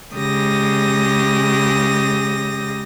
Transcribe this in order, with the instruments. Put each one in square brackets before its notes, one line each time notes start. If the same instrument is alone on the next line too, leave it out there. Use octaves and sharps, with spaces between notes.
[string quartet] C#3 G#3 G4 D#6 A#6